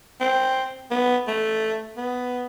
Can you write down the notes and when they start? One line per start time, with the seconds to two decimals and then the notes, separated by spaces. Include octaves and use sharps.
0.21 C4
0.91 B3
1.27 A3
1.97 B3